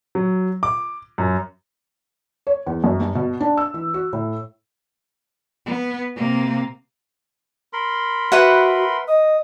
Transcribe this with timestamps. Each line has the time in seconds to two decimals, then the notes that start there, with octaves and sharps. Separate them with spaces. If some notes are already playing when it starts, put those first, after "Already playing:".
0.15 F#3
0.63 D6
1.18 F#2
2.47 C#5
2.66 E2
2.84 F#2
3.00 G2
3.15 B2
3.41 D4
3.57 E6
3.74 E3
3.94 F#4
4.13 A2
5.66 B3
6.16 C3 A#3
7.73 A#4 B5 C6
8.32 F#4 B4 E5 F#5
9.08 D#5 D#6